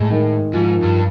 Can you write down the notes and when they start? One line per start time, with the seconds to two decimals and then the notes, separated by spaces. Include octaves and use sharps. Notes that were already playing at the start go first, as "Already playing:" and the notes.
Already playing: A2 G#3
0.10 D#3
0.53 G#2 F3
0.83 G2